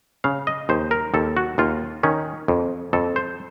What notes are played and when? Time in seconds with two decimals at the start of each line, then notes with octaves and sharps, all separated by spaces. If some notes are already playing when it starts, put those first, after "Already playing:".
0.24 C#3 F5
0.47 D#5
0.69 D#2 C5
0.91 A#4
1.14 D#2 A4
1.37 F#4
1.58 D#2 F4
2.03 D#3 C#4
2.48 F2
2.93 F2 A4
3.16 C5